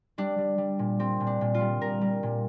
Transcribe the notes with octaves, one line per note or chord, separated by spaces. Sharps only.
G3 D4
G3
G3
A#2
G3 C4
A#2
D4
A#2
F4
G3
A#2 A#4
G3
A#2